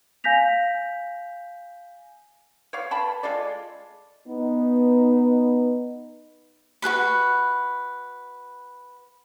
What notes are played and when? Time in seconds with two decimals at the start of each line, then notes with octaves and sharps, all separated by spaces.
0.24 F5 G#5 G6 A#6 B6 F7
2.73 C#5 D5 F5
2.91 B4 G5 A5 B5
3.23 G#3 F4 A4 D5
4.27 B3 D#4
6.82 F#4 A4 B4 B5